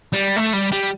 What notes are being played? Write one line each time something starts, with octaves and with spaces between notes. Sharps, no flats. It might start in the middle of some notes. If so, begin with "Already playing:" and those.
G3
A3
G3
G3